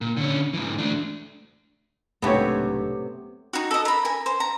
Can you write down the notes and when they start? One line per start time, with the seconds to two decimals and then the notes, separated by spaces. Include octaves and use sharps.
0.01 A#2
0.17 D3 C#4
0.54 G#2 E3
0.78 A3 D4
2.22 B1 G#2 C3 A3 B3 D4 G4 C#5
3.53 D#4 F#4
3.71 A4 D#5
3.85 A#4 B5
4.05 A#4 G#5
4.26 C5
4.40 A#5